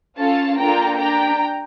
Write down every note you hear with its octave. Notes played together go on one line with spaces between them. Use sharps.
C#4 F4 A4 F5 A5
A#3 D4 F4 A4 G5 A#5
D4 G4 G5 A#5